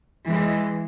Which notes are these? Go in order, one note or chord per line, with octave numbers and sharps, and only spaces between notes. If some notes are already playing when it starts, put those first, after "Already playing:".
E3 G#3